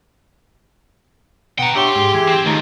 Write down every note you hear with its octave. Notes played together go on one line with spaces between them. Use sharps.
B2 F#5 G5 A#5
D4 G4 C#5 E5 F#5 C6
G#2
E3 G#4 D6
C4
C#2 D#3 A3 D#4